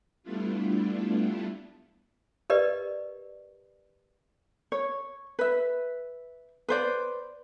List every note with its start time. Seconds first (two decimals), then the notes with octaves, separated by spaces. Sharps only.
0.23 G3 A3 B3 D4 E4 F4
2.50 G4 A#4 B4 D5 D#5
4.72 C#5
5.39 B4 E5
6.69 B4 C5 D5